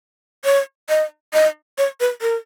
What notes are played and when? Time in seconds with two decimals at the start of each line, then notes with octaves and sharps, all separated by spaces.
0.45 C#5
0.89 D#5
1.34 D#5
1.78 C#5
2.00 B4
2.22 A#4